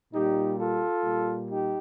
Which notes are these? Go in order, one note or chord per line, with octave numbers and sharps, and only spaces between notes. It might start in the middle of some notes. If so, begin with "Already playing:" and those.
A#2 G3 D#4 G4
F4 A4
A#2 G3
D#4 G4